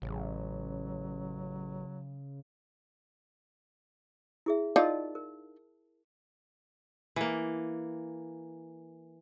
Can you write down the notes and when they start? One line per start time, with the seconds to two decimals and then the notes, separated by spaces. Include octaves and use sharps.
0.02 A1 C#3 F#3
4.46 E4 G#4 E5
4.76 D#4 F4 A#4 D5 A5
5.15 A#4
7.16 E3 A#3